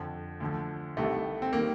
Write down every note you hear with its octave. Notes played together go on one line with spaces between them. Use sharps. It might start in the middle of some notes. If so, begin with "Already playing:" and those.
Already playing: F2 D3 F3
D2 D3 F3
C2 C3 D#3 A3
C4
D#3 G3 A#3